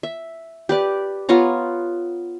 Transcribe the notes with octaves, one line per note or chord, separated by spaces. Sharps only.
E5
G4 B4 D5
B3 F4 C#5 A#5